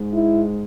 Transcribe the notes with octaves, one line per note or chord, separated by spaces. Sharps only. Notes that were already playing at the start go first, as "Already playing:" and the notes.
Already playing: G#2 G#3
E4